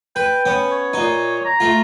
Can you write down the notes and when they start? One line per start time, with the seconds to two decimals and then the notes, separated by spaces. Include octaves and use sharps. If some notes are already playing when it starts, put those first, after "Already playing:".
0.16 B4 G5
0.46 B3 C#4
0.72 C#5
0.93 A#2 D#4
1.45 A#5
1.60 A3 F4